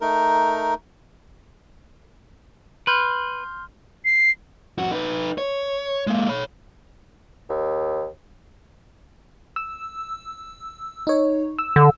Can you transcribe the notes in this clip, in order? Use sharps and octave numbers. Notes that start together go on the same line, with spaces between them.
A3 D#4 A#4
B4 C6 F6 G6
C7
F2 F#4
D#4 B4
C#5
G#3 A#3
C#5 B5
D#2
E6
D#4 C#5
E6
D3